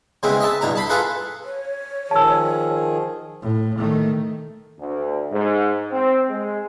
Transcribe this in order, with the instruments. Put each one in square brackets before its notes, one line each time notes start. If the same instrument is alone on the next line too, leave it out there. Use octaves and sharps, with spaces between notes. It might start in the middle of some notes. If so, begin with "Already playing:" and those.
[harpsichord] C#3 G#3 B3 C4 E4
D#5 E5 A5
G2 B2 E4 A#5
A5 B5 C6
F4 G#4 A4 B4 F#5
[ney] C#5
[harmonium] D#3 F3 G#4 [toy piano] A5 E6
[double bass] A2
D#3 A3
[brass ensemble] D2
G#2
C4
G#3